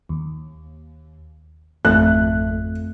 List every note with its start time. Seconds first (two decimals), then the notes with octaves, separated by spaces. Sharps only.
0.09 D#2
1.85 G#1 F2 A3 F#6